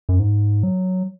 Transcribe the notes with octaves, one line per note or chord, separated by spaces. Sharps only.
F#2
G#2
F#3